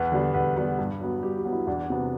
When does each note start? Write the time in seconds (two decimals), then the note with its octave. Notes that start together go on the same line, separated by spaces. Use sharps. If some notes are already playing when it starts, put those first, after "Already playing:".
Already playing: E2 B4
0.12 D3 G3 B3
0.34 E2 B4
0.56 D3 G3 B3
0.79 G2
1.01 F#3 B3
1.23 G2 G4
1.37 G4
1.45 F#3 B3
1.52 E4
1.67 E2 D4
1.90 C3 F#3 B3